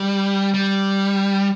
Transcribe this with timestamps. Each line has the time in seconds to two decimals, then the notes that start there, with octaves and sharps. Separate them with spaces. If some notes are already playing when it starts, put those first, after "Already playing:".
Already playing: G3
0.54 G3